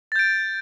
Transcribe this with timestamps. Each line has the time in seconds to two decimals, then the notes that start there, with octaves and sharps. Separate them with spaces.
0.12 A6
0.16 G6
0.19 D7